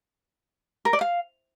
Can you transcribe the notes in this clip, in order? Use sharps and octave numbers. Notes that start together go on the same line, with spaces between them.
A#4
D5
F5